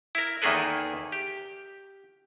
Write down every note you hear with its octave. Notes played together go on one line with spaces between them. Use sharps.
E4 A#4
E2 D#3 A#3 G#4 A4 B4
G4